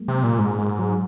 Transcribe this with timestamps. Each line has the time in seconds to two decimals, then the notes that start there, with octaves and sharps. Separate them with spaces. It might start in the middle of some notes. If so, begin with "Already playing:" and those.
Already playing: F#3 G#3 A#3
0.08 C3
0.23 A#2
0.39 G#2 G#3
0.59 G#3
0.79 F#3